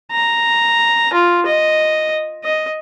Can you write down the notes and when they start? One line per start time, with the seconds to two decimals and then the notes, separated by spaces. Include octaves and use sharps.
0.12 A#5
1.13 F4
1.46 D#5
2.44 D#5